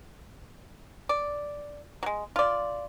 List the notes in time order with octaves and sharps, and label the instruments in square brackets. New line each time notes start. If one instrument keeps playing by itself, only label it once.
[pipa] D5
F#3 G#3
F4 D5